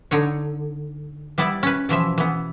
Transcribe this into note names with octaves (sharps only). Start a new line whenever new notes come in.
D3 D#4 C#5
G3 B3 E4 D5
C#4 B4
B2 E3 F3 E5
E3 B3